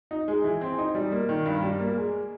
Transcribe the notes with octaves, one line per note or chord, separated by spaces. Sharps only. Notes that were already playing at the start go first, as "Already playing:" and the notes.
D#4
G#3
E3
C4
D#4
G3
A#3
D#3
G2
G3
A#3
G#3